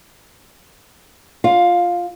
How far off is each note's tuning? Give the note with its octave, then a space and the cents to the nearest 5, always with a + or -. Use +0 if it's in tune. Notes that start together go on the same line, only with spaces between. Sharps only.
F4 +0 F5 +15